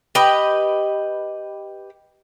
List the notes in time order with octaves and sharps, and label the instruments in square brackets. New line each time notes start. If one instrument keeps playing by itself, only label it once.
[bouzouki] G4 B4 D#5